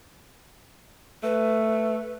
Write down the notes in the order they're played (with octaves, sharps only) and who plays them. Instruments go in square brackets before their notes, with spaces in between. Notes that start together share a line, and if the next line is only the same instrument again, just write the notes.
[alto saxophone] A3 [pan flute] B4